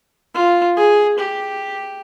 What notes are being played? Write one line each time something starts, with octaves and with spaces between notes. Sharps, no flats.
F4
G#4
G4